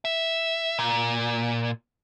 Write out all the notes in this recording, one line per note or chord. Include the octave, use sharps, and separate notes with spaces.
E5
A#2